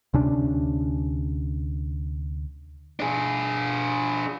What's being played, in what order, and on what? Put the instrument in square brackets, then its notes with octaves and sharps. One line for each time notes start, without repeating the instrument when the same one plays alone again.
[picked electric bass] D2 C3 C#4 D4
[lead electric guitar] D4 G#4